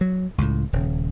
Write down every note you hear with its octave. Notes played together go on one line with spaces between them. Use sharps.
F#3
C#2 A2
D#1 C#3